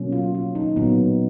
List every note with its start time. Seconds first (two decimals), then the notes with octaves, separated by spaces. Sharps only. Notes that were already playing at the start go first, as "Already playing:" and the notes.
Already playing: B2 F#3 A#3 C#4
0.12 F4
0.35 F4
0.55 D#4
0.76 A#2 F#3 B3